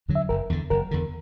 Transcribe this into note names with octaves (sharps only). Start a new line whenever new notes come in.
E2 D3 F#3
E5
F#1 A#4
E2 D3
F#1 A#4
E2 D3